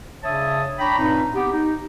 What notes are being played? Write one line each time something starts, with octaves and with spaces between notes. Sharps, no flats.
C#3 D4 C#5 E5 A5 D#6
D4 C#5 G5 A#5 B5
G2 A#2 C4 D#4
B3 G4
D#4